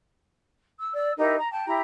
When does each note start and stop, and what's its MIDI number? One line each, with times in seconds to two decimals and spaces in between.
0.77 0.92 88
0.93 1.11 74
0.93 1.11 88
1.17 1.34 63
1.17 1.34 64
1.17 1.34 67
1.17 1.34 70
1.36 1.49 82
1.51 1.66 79
1.51 1.66 81
1.66 1.81 64
1.66 1.81 67
1.66 1.81 82